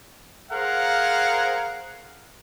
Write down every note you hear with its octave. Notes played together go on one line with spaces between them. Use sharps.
G#4 A#4 C5 F5 F#5